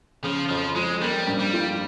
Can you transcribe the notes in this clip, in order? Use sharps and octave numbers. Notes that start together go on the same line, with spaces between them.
C#3 F3
F2 F3
F3 G#3
G3 A#3
G2
G3
F4